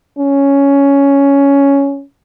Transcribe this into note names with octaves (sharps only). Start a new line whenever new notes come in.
C#4